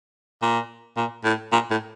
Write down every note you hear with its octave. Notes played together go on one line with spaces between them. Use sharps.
A#2
A#2
A2
A#2
A2